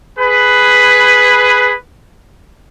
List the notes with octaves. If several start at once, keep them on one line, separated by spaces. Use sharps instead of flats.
G#4 B4